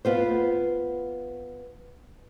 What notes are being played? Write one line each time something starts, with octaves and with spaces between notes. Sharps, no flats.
B3 F4 C5